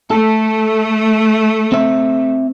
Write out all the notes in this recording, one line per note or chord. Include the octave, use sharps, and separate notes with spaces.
A3 A4
C4 E5